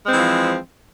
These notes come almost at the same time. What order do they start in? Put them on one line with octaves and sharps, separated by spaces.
G#3 C4 E3 F3